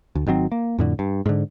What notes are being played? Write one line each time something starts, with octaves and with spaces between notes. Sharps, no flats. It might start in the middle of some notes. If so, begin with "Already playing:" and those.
D2
G#1 D#3 F#3 C4
A#3
F2 A2 D3
G2
G#2 D3